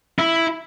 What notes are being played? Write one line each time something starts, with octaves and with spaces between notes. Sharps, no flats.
E4